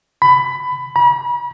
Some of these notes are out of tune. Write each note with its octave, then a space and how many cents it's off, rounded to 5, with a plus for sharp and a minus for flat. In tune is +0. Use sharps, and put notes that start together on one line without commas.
B5 +15
B5 -40